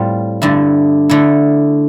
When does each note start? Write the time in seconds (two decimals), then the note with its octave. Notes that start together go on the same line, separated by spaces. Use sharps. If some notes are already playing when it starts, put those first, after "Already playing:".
Already playing: A2 G3 C4 F4
0.42 G2 D3 A3 E4
1.09 D3 A3 E4